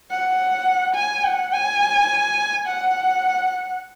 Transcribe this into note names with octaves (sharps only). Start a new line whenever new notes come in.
F#5
G#5
F#5
G#5
F#5